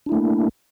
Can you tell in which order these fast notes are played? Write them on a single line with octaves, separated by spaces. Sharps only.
D4 E4 A3 A#3